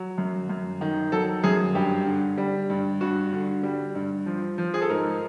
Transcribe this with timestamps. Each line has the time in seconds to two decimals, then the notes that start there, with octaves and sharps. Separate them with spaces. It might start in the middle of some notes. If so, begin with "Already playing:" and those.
Already playing: F#3
0.18 F#2
0.49 F#2
0.81 D#3
1.12 F#3 A4
1.43 F#2 G#4
1.75 G2 G4
2.07 D3
2.38 G3
2.70 G2
3.01 G2 F#4
3.33 D3
3.63 G3
3.95 G2
4.26 F3
4.58 F3
4.74 G#4
4.81 A4
4.90 G#2 A#4